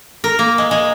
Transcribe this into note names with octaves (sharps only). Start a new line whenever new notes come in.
A#4
A#3
G#3
G#3